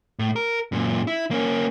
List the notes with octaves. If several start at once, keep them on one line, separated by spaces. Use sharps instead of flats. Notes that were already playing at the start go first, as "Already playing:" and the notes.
A2
A#4
F#2 A#2
E4
A#3 C#4